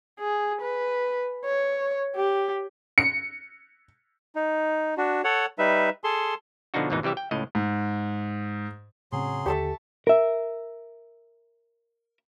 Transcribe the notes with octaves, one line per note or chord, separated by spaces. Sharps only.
G#4
B4
C#5
G4
C#7
D#4
D4 F#4
A4 C#5 F#5
G3 D#4 B4 E5
G#4 A4 A5 C6
B2 D3 F3 D4 D#4 F#4
G#1 D2 G#2 B2 E3 D#4
C3 E3 G3 G4 E5
G5
C#2 A2 D#5
G#2
A2 C#3 F#3 C4 G#4 C6
D#2 D3 G4 A4 E5 A5 C#6
A#4 E5